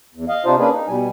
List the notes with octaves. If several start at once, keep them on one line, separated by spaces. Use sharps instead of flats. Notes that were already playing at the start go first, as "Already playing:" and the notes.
E2
D#5 F5
C3 D4 D#4 F4 C5
A#3 C#4 D4 G#4 B4
D#4
B2 G3 G#5